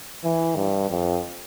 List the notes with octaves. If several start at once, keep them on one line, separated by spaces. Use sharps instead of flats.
E3
G2
F2